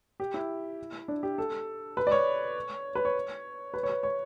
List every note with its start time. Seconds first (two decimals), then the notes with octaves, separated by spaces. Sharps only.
0.20 G4
0.34 E4
1.08 D4
1.23 G4
1.38 A4
1.97 B4
2.07 D5
2.12 C#5
2.95 B4
3.05 C#5
3.74 B4
3.83 C#5
3.90 B4
4.03 C#5